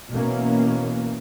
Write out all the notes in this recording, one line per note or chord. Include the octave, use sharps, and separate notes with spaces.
B2 E3 A#3 C#4